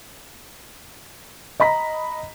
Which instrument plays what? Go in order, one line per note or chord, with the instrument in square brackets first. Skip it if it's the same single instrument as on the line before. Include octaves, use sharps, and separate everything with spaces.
[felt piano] D#5 A#5 B5 B6